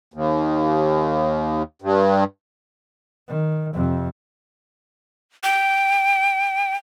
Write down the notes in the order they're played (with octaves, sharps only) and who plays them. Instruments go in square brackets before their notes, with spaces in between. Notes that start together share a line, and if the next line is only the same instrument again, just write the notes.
[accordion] D#2
G2
[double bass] D#3
F2 C3
[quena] G5